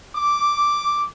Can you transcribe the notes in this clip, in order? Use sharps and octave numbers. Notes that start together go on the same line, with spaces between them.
D6